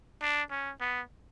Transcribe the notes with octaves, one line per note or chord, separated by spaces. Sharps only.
D4
C#4
B3